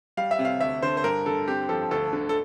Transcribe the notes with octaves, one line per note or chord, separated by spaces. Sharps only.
G3 F5
E5
C3
F5
D2 E5
D3 C5
C5
G2 A#4
D3 A4
C4 G4
F3 A4
D2 A4
D3
A4